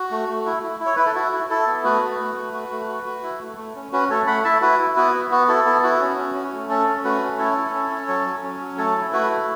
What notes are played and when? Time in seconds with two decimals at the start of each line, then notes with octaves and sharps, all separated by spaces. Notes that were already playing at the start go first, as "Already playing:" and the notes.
Already playing: F#4
0.11 A3
0.29 A3
0.46 E4
0.63 E4
0.80 E4
0.86 C#5
0.96 E4 B4
1.06 A4
1.15 E4 F#4
1.32 E4
1.50 E4 A4
1.67 B3
1.84 A3 F#4 B4
2.02 A3
2.20 A3
2.36 A3
2.53 F#4
2.71 A3
2.88 F#4
3.06 F#4
3.23 E4
3.40 A3
3.57 A3
3.75 C#4
3.92 C#4 F#4 B4
4.10 A3 A4 C#5
4.27 A3 F#5 B5
4.44 E4 E5 A5
4.62 E4 F#4 B4
4.79 E4
4.96 B3 F#4 B4
5.14 B3
5.31 B3 F#4
5.48 E4 A4
5.66 B3 A4
5.83 E4 F#4
6.00 C#4
6.18 C#4
6.35 C#4
6.53 A3
6.69 C#4 A4
6.87 C#4
7.04 A3 F#4 B4
7.22 C#4
7.39 E4 A4 C#5
7.57 E4
7.74 C#4
7.91 C#4
8.08 F#3
8.26 F#3
8.43 C#4
8.60 F#3
8.78 A3 A4 C#5
8.95 E4
9.13 A3 F#4 B4
9.30 E4